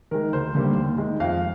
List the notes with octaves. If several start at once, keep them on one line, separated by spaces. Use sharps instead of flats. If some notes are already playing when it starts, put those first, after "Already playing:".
D#3 G#3 A#4
D2 C5
D3 G3 A#3
D#2
D#3 G#3
F2 F5